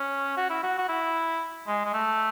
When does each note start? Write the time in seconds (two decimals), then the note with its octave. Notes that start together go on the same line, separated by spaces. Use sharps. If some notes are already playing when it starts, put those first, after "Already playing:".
Already playing: C#4
0.37 F#4
0.50 E4
0.63 F#4
0.78 F#4
0.89 E4
1.67 G#3
1.85 G#3
1.94 A3